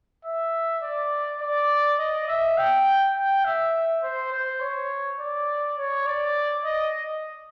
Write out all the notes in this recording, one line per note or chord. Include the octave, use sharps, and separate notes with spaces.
E5
D5
D5
D#5
E5
G5
G5
E5
C5
C5
C#5
D5
C#5
D5
D#5